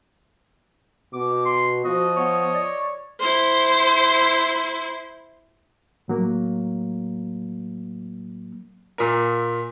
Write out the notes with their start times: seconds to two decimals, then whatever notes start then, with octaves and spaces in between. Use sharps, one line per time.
1.13 B2 D6
1.45 C6
1.85 F3 F#4 D#5
2.16 B3 C#5
2.54 D5
3.20 E4 C5
6.08 A2 F#3 A#3
8.98 A#2 A#4